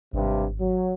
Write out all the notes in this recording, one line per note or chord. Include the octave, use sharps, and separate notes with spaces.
G#1 G2 C3
F#3